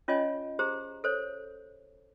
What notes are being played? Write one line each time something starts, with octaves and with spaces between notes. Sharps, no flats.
C#4 F4 C#5 D#5 G#5
G4 G#4 C5 A#5
A4 C5 C#5